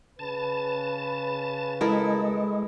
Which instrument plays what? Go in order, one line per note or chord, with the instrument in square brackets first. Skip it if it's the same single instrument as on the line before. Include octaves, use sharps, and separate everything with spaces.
[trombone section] C#3 B4 [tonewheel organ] A5
[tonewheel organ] G#3 [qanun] E4 A4 A#4